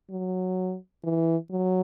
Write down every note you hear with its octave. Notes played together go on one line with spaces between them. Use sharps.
F#3
E3
F#3